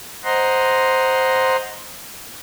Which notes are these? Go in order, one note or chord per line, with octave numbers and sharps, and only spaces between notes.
C5 D#5 F#5 A#5 C6